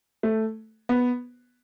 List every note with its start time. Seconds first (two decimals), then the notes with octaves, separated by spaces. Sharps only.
0.23 A3
0.89 B3